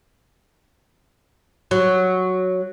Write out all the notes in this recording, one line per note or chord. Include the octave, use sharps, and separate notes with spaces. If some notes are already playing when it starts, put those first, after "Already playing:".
F#3